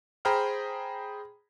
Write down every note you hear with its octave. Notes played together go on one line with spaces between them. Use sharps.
G#4 C5 G5 A#5 B5 F6